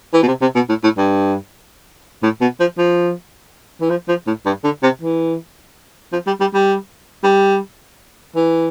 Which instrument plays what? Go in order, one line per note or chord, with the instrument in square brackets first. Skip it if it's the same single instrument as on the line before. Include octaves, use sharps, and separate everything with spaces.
[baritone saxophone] E3
B2
C3
C3
B2
A2
A2
G2
A2
B2
F3
F3
E3
F3
F3
A2
G2
D3
C3
E3
F3
G3
G3
G3
G3
E3